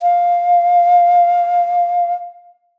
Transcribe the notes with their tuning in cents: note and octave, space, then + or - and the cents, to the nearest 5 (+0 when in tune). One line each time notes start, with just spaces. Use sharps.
F5 +5